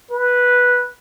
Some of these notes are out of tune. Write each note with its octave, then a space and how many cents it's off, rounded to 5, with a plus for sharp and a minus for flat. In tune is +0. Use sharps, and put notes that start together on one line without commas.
B4 -5